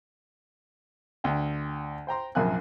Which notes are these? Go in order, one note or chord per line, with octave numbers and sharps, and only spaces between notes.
D2 G5
C5 G5 A#5 C6
A#1 F#2 C3 F5 G#5 F#6